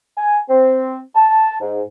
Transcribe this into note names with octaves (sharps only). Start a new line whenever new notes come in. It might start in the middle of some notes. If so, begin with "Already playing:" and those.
G#5
C4
A5
G#2